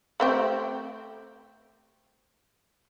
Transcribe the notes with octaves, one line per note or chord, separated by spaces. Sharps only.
A3 C4 G4